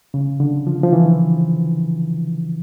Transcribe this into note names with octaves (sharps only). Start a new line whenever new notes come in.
C#3
D3
F3
F3
E3